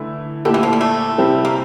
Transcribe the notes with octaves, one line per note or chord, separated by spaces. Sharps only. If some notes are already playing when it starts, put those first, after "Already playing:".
Already playing: D3 E3 A3 E4
A#2 D3 A3 E4 G4
E3
F3
G3
A3
C3 G3 C4 E4 G4
A#3